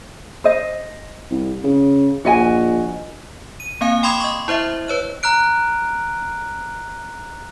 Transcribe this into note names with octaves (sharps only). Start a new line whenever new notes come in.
C5 D#5
C2
C#3
A#1 F#4 D#5 G#5
D#7
A#3 C4 F5 G#5
G5 B5 C6 D6 D#6 G#6
D#5 C#6
E4 C5 D#5 E5
B4 C#5 F#6
A#5 F6 F#6 D7